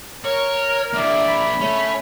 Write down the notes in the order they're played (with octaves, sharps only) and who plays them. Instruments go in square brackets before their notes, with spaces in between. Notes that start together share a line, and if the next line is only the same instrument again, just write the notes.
[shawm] A#4 [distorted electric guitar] C#5
[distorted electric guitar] A#3 D4 [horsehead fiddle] D5 E5
[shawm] B5
[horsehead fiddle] A3 [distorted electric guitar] C#4